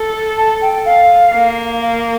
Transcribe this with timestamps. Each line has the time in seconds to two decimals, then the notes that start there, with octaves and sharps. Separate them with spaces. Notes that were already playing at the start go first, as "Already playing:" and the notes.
Already playing: A4
0.38 A5
0.62 G5
0.85 F5
1.34 A#3
1.82 F5